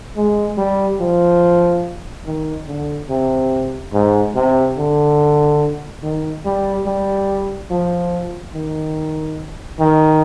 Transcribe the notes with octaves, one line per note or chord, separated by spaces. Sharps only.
G#3
G3
F3
D#3
D3
C3
G#2
C3
D3
D#3
G3
G3
F3
D#3
D#3